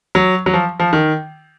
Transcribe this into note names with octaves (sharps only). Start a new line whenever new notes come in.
F#3
F#3
F3
F3
D#3